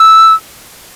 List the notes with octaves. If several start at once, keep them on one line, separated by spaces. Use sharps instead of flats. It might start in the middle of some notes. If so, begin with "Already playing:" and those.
Already playing: E6